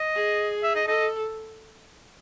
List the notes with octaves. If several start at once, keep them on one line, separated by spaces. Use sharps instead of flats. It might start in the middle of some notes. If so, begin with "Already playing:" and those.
Already playing: D#5
G#4
E5
D#5
A4 D#5